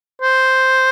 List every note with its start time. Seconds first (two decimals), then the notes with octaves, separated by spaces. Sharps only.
0.22 C5